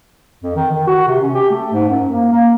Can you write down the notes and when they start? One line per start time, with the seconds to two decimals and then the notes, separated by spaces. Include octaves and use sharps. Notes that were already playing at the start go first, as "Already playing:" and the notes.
0.43 F2
0.56 D#3
0.71 D#3
0.87 F#4
1.07 C3
1.22 C#4
1.34 G4
1.50 A3
1.73 G#2
1.89 F#2
2.12 A#3
2.32 A#3